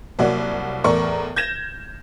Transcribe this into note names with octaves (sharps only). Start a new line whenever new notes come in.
C2 F#3 A#3 F#4 D5
E2 A2 A#4 D5 C#6
G6 G#6 A#6 E7